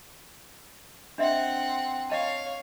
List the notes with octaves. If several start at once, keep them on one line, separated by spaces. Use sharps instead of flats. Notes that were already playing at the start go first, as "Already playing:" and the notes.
C4 D4 D#5 E5 F#5
C#5 D#5 F5 A5